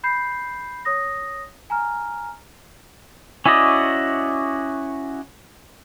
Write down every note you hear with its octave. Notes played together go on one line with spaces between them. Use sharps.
B5 G6 C7
C#5 D#6 A#6
G#5 A#5 F6
C#4 E4 F#4 D5 D#5